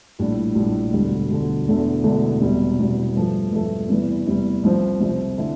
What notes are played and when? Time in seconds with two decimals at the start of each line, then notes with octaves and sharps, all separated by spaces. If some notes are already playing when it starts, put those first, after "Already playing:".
0.19 A#1 A2 G3 D4
0.55 A#1 A2 G3 D4
0.93 E1 D2 D3 G3
1.30 E1 D2 D3 G3
1.67 E1 E2 D3 A3 D4
2.04 E1 E2 D3 A3 D4
2.41 E1 E2 C3 G3
2.79 E1 E2 C3 G3
3.16 G2 F3 A3
3.52 G2 F3 A3
3.89 E2 C3 E3 G3
4.27 E2 C3 E3 G3
4.63 C2 C3 F3 C4
5.00 C2 C3 F3 C4
5.38 D3 A3 E4